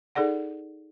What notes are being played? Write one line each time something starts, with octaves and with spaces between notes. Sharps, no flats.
D#4 G#4 A4 D5 F#5